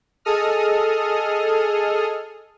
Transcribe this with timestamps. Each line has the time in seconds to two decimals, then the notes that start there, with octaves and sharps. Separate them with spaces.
0.25 G#4 A4 D#5 D#6 F6